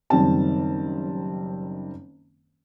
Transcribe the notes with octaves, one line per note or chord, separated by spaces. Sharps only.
F#1 D#3 G3 C4 A5